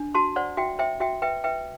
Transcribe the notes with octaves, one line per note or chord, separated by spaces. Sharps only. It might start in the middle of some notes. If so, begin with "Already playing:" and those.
Already playing: D4
F#4 A5 C6
C5 D5 F#5
F#4 E5 G5
C5 E5 G5
F#4 E5 G5
B4 E5 G5
B4 E5 G5